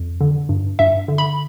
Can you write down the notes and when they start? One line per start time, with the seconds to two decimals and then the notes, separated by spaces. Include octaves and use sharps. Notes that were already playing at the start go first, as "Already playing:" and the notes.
Already playing: F2
0.21 D3
0.49 G2
0.79 G2 E5
1.08 D3
1.18 B5